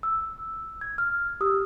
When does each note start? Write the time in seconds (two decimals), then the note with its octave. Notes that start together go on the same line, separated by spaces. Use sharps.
0.03 E6
0.81 G#6
0.98 F6
1.41 G4 D#6 E6